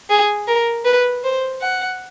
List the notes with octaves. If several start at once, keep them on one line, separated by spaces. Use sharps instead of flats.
G#4
A#4
B4
C5
F#5